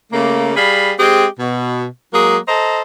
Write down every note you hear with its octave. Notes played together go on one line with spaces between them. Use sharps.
C#3 A3 A#3
G3 G#4 F5 B5
G#3 C4 G4 G#4
B2
F#3 G#3 A#3 G#4
A4 C5 D#5 A#5